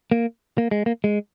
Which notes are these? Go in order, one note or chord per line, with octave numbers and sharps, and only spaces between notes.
A#3
A#3
G#3
A#3
G#3